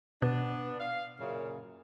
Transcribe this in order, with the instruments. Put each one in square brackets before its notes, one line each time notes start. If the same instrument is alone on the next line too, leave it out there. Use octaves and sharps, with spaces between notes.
[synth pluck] B2 [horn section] B3 D4
[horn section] F5
F#2 A#2 C#3